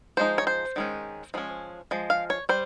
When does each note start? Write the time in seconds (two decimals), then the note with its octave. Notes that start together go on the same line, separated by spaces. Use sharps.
0.17 F3 G#3 D#4 C5
0.38 C#5
0.47 C5
0.76 D#3 G#3 C#4
1.34 F3 G#3 C#4
1.91 F3 G#3
2.10 F5
2.30 C#5
2.49 G3 C5